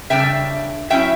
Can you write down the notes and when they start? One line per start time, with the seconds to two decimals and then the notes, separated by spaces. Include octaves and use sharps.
0.10 C#3 G3 D4 E5 G5
0.90 F#3 C#4 E4 E5 G5